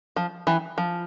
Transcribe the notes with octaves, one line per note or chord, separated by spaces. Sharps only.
F3
E3
F3